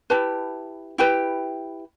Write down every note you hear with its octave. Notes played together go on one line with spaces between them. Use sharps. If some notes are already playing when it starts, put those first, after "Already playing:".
E4 G4 B4 A5
E4 G4 B4 G5